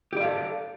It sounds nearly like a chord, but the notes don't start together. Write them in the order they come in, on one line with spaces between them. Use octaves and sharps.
G4 D5 F5 A4